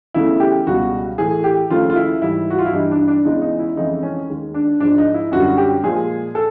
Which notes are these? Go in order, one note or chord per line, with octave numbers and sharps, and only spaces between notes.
E2 C#3 E3 A3 E4
G4
C#2 B2 G3 F#4
A2 E3 A3 G#4
G4
D#2 C#3 F3 A3 F4
F4
E4
G#2 E3 G3 E4
F#4
F4
E4
G2 E3 G3 D#4
D4
D4
E2 C#3 E3 G#3 D#4
D#4
E4
F2 C#3 E3 G#3 D#4
C#4
D#2 D#3 G#3
D4
G#2 F3 G#3 D4
D#4
E4
F#2 D3 G3 F#4
G4
A#2 F3 G#3 G#4
A4